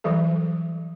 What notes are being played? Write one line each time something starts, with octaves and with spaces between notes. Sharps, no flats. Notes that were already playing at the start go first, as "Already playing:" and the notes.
E3 F#3 G3 A4